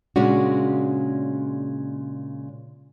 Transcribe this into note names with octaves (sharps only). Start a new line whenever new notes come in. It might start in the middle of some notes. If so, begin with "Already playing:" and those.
A#2 C#3 G#3 C#4 D4 F#4